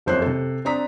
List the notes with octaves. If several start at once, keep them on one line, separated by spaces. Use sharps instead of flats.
F#1 F2 C5 C#5 F#6 C7
C3 A4
C4 D4 A#5 D#6 B6